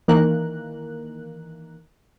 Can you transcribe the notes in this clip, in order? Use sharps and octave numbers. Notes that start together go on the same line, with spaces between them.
D#3 E3 A#3 A#4 F#6